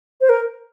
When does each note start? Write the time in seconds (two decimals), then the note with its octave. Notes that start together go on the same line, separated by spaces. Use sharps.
0.21 C5
0.29 A#4